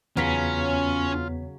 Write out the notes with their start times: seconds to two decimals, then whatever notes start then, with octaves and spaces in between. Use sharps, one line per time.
0.17 E2 C#3 F#3 B3 C#4 F4 B6